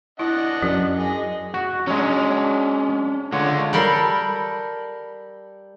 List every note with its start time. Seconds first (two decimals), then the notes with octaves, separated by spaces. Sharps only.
0.19 D4 E4 D#5 F#5
0.62 F#2 F#3
0.98 G#4 D#5
1.54 F#4
1.87 F#3 G#3 C#4 D4
3.33 D3 G#3 F4 C#5
3.73 G3 A4 A#4 B5 C6